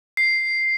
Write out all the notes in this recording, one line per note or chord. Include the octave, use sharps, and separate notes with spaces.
C7